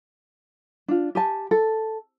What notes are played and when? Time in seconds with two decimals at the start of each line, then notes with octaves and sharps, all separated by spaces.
0.88 D4 F4
1.15 G4 G#5 A5
1.51 A4